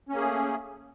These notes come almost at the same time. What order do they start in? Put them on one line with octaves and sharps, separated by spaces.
C#4 A#3 G#4 A3